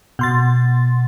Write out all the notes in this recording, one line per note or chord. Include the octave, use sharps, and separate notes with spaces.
B2 C6 A6